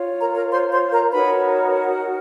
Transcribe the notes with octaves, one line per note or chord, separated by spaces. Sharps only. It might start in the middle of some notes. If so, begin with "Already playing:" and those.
Already playing: F4 C#5
A#4 A#5
A#4 A#5
C5 C6
C5 C6
A#4 A#5
D#4 F#4 A#4 B4 C#5 B5